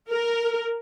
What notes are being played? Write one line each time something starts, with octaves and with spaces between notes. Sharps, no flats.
A#4